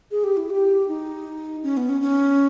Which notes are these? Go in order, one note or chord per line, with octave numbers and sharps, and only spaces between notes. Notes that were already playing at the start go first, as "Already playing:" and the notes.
G#4
G4
E4
G4
D#4
C#4
B3
C#4
C#4